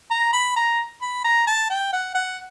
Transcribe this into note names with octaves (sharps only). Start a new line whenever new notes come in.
A#5
B5
A#5
B5
A#5
A5
G5
F#5
F#5